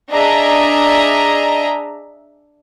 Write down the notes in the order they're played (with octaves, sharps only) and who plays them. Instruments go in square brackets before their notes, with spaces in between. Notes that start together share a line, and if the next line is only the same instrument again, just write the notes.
[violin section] D4 G#4 D#5 E5 A#5